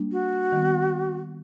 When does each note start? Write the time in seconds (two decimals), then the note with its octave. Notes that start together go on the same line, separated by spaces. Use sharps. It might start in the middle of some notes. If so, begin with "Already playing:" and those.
Already playing: G3 A#3 D4
0.12 F#4
0.52 D#3 G3 B3